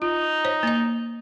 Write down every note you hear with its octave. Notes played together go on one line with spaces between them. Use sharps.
D#4 F4
C5 C#5
A#3 D#5